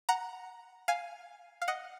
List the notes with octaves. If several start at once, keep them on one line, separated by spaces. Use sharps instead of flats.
F#5 A#5
F5 G#5
F5
D#5 F#5